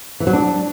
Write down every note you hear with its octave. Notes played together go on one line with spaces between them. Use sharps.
E3
F#3
D4